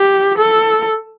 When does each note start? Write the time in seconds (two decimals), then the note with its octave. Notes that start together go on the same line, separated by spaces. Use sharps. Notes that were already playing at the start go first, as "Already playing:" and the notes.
Already playing: G4
0.38 A4